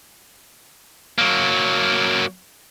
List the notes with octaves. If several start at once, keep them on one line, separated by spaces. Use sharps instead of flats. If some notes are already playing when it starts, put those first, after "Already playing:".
F#3 A#3